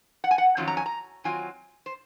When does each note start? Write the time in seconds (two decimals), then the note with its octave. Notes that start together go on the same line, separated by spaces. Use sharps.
0.24 F#5
0.31 G#5
0.38 F#5
0.57 F2 D#3 F#3 C#4 F4
0.67 A#5
0.77 G#5
0.86 A#5
1.24 D#3 F#3 C4 F4 G#5
1.86 C5